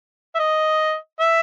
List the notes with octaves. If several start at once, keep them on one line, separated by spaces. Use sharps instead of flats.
E5
D#5
E5